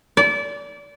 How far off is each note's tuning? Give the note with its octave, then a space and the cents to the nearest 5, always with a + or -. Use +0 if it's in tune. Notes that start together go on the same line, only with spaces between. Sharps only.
D5 -30